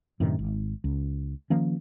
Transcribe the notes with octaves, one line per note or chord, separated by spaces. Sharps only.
F#2 A2 C3 D#3
G#1
C#2
D#3 F3 A#3 C#4